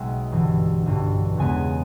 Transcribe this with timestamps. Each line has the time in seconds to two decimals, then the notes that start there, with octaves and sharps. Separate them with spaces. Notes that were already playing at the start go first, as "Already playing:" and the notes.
Already playing: B1 B2 G#3 E5 G5
0.32 G1 G2 E3
0.86 G1 G2 E3
1.37 E2 C#3 G#3 B3 G#5